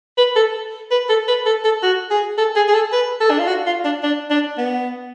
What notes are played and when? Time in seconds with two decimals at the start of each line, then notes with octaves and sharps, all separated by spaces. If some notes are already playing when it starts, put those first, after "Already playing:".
0.18 B4
0.36 A4
0.91 B4
1.09 A4
1.28 B4
1.46 A4
1.64 A4
1.83 F#4
2.11 G#4
2.38 A4
2.56 G#4
2.68 G#4
2.74 A4
2.92 B4
3.21 A4
3.30 D4
3.39 F4
3.48 F#4
3.66 F4
3.84 D4
4.03 D4
4.30 D4
4.58 B3